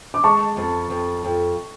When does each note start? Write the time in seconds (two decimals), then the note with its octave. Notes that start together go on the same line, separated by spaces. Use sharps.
0.14 D6
0.24 G#3 A5 C#6
0.57 F2
0.90 F2
1.25 F2